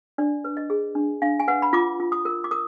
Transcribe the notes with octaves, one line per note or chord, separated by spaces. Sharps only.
D4 D5
B4
D#5
G#4
D4
D4 F5
G#5
B4 F#5
B5
F4 D6
F4
D#6
A#4
D6
A#4 D#6